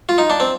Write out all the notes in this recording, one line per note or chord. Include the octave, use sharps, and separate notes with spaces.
F4
D#4
D4
C4